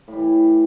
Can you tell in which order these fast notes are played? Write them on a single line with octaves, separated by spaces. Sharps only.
A2 G3 E3